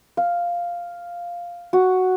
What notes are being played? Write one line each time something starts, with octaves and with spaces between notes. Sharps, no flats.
F5
F#4